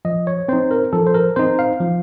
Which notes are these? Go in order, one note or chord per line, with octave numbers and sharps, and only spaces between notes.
F3 D#5
C#5
C4 D#4 C5
A#4
F3 A4
C5
A#4
C4 D#4 C5
F5
F3